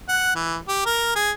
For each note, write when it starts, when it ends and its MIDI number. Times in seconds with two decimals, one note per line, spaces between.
0.08 0.35 78
0.35 0.57 52
0.68 0.82 67
0.86 1.13 70
1.15 1.31 68